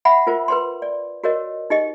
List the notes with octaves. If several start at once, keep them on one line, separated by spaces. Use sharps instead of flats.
E5 F#5 B5
F4 A#4 C5
B4 C5 C6
D5
F#4 A#4 C#5 D#5
D#4 G4 D#5